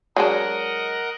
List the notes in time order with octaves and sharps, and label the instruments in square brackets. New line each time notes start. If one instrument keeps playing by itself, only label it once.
[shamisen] F#3 G#3 D4 [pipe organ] A#4 D#5 F#5